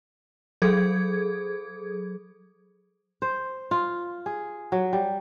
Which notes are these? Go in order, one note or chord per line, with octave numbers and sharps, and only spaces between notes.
F#3 G#4 A4 G#6
C5
F4
G#4
F#3
G3